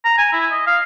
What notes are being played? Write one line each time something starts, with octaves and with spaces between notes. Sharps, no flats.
A#5
G#5
E4
D#5
F5